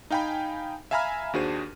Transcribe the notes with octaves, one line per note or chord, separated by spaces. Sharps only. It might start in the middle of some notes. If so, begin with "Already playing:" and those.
D#4 F5 G5 G#5 B5
E5 F5 G#5 A#5 B5 F6
D#2 D4 F#4 G#4 C5 D#7